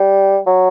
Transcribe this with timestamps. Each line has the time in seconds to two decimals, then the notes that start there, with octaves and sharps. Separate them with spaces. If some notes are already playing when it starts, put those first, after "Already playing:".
Already playing: G3
0.47 F#3